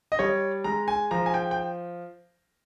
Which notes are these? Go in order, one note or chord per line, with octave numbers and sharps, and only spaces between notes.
D#5
G3 C#5
G#3 A#5
G#5
F3 A#5
G#5
G5
G5